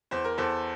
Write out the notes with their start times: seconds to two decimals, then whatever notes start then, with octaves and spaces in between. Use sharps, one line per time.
0.11 E2 C5
0.24 A#4
0.38 E2 A4 C5